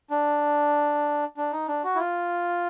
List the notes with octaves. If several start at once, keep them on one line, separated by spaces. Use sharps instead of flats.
D4
D4
D#4
D4
F#4
E4
F4